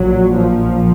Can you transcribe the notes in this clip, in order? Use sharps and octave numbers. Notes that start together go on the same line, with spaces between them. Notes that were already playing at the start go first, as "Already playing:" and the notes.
Already playing: A#1 A#2 F#3
F3